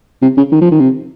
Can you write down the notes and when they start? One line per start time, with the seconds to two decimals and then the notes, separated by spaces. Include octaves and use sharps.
0.22 C3
0.37 C#3
0.52 D#3
0.61 F3
0.71 D#3
0.80 C3